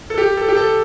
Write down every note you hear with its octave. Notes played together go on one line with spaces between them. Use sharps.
A4
G4
A4
G4
A4